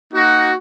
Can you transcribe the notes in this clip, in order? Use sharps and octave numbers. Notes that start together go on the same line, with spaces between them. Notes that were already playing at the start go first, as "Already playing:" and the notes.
A#3 D#4 F#4